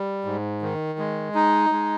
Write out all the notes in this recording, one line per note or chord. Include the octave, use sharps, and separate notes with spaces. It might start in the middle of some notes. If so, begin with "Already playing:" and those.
Already playing: G3
G#2
D#3
G#3
D#4
G#3